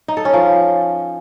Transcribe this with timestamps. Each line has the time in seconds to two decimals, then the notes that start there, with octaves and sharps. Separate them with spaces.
0.08 D#4
0.17 A4
0.25 C#4
0.34 F3